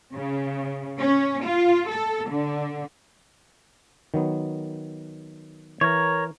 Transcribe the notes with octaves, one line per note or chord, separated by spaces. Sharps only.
C#3
C#4
F4
A4
D3
D#3 F#3 B3
E3 A#4 C#5